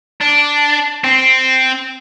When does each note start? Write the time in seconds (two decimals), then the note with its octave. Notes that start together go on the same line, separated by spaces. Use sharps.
0.21 D4
1.04 C4